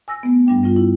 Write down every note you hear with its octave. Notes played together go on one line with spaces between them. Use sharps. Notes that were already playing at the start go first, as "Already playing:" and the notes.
G#5 E6 A#6
A3 B3
G2 G3 D4 G5
G3 C#4 F4
E4